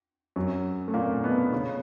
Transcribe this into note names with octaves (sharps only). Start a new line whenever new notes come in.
F#2 F#3
A3
A#2 A#3
B2 B3
C#3 C#4